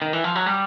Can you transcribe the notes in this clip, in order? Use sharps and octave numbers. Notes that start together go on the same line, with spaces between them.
D#3
E3
F3
F#3
G3